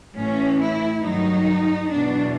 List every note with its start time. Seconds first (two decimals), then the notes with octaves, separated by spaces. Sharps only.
0.16 A2 E3 C#4
0.60 E4
1.03 G2 D#3 F#3 D#4
1.90 E2 B2 F#3 D4